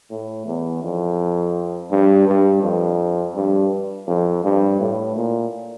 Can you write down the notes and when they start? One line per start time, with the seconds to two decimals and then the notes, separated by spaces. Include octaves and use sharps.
0.11 A2
0.46 E2
0.83 F2
1.91 G2
2.27 G2
2.63 F2
3.35 G2
4.08 F2
4.44 G2
4.80 A2
5.16 A#2